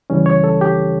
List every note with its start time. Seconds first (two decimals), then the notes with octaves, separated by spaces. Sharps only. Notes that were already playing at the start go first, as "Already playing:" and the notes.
0.10 C#2 C#3 E3 G3 C#4
0.26 C#5
0.44 A4
0.61 G4